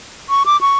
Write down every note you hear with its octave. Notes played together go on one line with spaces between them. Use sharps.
C#6
D6
C#6